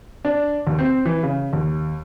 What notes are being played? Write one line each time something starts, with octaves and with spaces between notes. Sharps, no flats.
D4
D#2
C4
E3
C#3
D#2